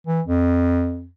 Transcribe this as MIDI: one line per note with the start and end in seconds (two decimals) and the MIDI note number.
0.07 0.21 52
0.27 1.09 41